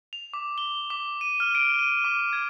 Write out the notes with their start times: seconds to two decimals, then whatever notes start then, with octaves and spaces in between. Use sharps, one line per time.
0.13 F7
0.33 D6
0.58 G7
0.90 D6
1.21 D#7
1.40 F6
1.55 D7
1.79 D#7
2.04 D6
2.33 G#6